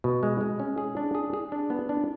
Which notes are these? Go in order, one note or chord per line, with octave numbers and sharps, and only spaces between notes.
B2
G#3
G#3
C#4
G#4
D4
G#4
G#4
D4
B3
D4